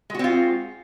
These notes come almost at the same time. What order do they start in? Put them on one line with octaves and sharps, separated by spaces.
G#3 F#4 C4 F4